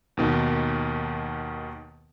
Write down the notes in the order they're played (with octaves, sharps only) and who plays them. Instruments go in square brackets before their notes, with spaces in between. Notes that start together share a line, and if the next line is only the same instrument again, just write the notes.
[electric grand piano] D#2 B2 D#3